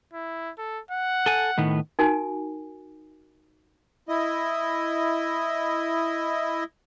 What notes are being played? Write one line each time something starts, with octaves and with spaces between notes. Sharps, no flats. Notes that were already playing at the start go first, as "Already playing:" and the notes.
E4
A4
F#5
A4 G#5
A2 D#3 B3
D#4 F#4 A#4 G#5
E4 D#5